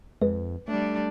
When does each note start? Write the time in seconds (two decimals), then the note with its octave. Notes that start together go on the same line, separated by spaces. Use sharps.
0.22 F2 G#3 B4
0.68 G3 A3 D4